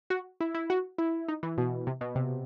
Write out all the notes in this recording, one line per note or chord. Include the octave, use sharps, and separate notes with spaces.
F#4
E4
E4
F#4
E4
D#4
E3
B2
C3
B2
C3